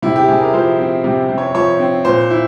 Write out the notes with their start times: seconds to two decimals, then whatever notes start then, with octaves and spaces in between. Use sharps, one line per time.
0.02 C3 E4
0.16 G4
0.28 C3 G#4
0.41 A#4
0.53 F3 C5
0.79 C4
1.04 C3
1.29 C3
1.38 C#5
1.54 F3 C#5
1.80 C4
2.05 A#2 C5
2.30 E4